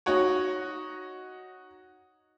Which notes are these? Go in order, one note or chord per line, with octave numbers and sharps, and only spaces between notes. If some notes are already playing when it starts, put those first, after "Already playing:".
D#4 F#4 C#5